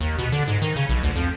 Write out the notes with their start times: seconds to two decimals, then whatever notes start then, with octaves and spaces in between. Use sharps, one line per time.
0.01 D#2
0.19 B2
0.32 D3
0.48 G#2
0.62 D#3
0.76 C#3
0.89 B1
1.03 D2
1.15 F2